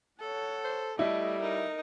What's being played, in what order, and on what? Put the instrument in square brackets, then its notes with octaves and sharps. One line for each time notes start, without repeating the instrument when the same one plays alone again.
[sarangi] A4 [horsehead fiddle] C#5 F#5
[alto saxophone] C5
[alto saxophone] G3 [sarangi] A3 [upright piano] E4 [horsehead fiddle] D#5
[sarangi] D#4 [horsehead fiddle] A#4